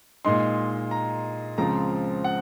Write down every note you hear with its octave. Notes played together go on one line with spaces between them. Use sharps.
A#2 G#3 D#4 C6
A#5
C#2 C#3 F3 C4 A#5
F#5